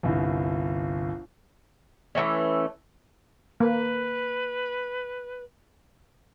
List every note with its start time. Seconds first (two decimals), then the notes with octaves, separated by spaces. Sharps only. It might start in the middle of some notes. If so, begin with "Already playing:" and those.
0.03 G1 C2
2.15 E3 G#3 A3 C#4
3.60 A#3 B4